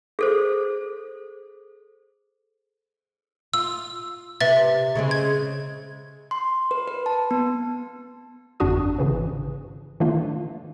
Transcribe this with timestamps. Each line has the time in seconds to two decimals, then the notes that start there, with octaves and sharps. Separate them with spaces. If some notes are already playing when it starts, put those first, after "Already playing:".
0.19 G#4 A4 C5
3.54 F4 E6
4.41 C3 B4 E5 A6
4.95 C#3 G#3 C4
5.11 G#6
6.31 C6
6.71 B4
6.88 B4
7.06 A5
7.31 B3
8.60 G1 F2 D4 F#4 D#6
8.99 G#1 C#3 E3 F3
10.00 D#3 E3 A3 A#3 D4 F4